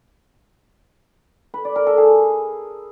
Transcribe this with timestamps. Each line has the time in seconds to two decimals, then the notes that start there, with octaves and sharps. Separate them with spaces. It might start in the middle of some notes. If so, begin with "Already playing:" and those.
1.54 B4
1.65 D5
1.76 A#4
1.87 A4
1.98 G#4